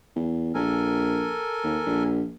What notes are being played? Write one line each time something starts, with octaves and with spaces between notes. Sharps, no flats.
E2
A#1 A4 A#4 G#5
D#2
A#1